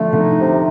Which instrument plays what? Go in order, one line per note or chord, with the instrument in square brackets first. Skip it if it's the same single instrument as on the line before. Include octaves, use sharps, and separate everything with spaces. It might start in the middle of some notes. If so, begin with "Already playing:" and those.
Already playing: [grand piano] D3 F3 [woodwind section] A3
[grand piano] D3 [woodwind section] D#4
[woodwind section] C3